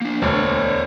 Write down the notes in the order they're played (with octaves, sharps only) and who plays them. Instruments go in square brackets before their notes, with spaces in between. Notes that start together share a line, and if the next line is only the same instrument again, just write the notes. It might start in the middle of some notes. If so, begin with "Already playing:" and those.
[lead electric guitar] A#3 D4
[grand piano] E1 D2 [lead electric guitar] C5 C#5